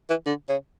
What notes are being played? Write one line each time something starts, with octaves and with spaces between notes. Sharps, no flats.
E3
D3
C#3